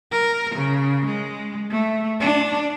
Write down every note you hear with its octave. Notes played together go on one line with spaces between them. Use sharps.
A#4
C#3
G#3
A3
D4